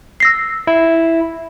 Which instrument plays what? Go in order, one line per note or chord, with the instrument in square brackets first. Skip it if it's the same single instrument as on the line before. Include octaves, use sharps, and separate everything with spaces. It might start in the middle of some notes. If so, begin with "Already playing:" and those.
[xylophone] E6 A#6 C7
[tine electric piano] E4